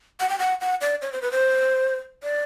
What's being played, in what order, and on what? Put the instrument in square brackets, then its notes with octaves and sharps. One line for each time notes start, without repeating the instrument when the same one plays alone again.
[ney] F#5
G5
F#5
F#5
D5
C#5
C5
B4
C5
D5